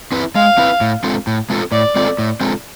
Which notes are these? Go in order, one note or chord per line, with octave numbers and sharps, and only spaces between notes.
C4 E4 B4
G#3 F5
C4 E4 B4
A2
G#3 C4 F4 A4
A2
G#3 C4 F4 A4
A2 D5
G#3 C4 F4 A4
A2
G#3 C4 F4 A4